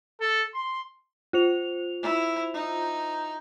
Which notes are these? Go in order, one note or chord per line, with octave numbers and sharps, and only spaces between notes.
A4
C6
F4 C5 F7
E4
D#4